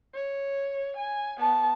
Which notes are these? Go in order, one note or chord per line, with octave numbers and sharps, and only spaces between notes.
C#5
G#5
B3 A5